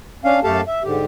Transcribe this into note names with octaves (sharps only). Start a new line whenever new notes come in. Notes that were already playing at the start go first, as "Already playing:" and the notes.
C#4 D4 F5
F#2 A3 G4 A4 F5 A5
E5
G#2 D3 G4